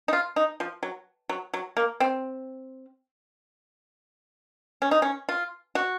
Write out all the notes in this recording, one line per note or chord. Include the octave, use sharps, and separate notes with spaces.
D#4
F4
D#4
F3
F#3
F#3
F#3
A#3
C4
C#4
D#4
C#4
F4
F#4